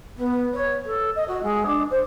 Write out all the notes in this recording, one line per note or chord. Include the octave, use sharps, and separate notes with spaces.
B3
C#5
A4
D#5
F#4
G#3
D4
C5